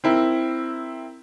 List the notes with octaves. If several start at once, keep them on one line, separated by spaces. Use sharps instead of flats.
C4 E4 A#4